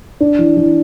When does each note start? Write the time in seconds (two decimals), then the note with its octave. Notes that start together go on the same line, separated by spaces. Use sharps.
0.20 D4
0.39 E3
0.57 E3